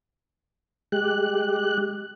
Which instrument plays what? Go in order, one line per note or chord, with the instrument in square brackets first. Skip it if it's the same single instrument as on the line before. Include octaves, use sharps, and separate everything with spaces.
[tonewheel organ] G#3 G4 F#6